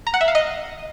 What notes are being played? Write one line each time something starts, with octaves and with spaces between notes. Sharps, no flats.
A#5
F#5
E5
F5
D#5